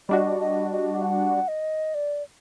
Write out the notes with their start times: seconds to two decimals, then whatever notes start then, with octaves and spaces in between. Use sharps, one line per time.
0.09 G3 D4 F#4 D#5
0.40 D#5
0.71 D#5
1.02 F#5
1.48 D#5
1.95 D5